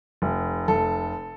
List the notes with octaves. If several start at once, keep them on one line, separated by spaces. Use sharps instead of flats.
F1
F1 A4